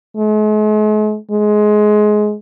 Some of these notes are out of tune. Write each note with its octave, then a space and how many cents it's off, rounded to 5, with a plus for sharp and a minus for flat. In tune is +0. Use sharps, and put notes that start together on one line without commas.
G#3 +45
G#3 +20